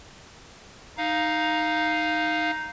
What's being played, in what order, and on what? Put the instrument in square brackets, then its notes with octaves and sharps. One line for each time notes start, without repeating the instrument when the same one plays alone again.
[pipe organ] D#4 F5